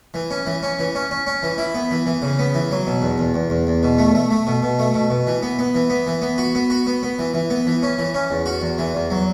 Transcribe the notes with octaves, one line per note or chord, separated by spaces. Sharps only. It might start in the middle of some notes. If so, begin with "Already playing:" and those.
E3
C#4
E3
C#4
E3
C#4
C#4
C#4
E3
E4
B3
E3
E3
C#3
B3
E3
F#3
B2
E2
E2
E2
E2
E2
B2
A3
A3
A3
B2
B2
A3
B2
B2
E3
B3
B3
E3
B3
E3
B3
F#4
B3
F#4
B3
B3
E3
E3
B3
E3
C#4
E3
C#4
E2
F#4
E2
E3
E2
F#3